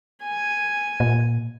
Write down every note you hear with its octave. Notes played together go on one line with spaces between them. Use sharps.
G#5
A#2